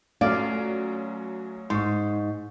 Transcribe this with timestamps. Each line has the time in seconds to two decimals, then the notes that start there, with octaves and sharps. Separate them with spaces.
0.21 F#2 F#3 A3 C#4 D5 F5
1.70 G#2 C6 C#6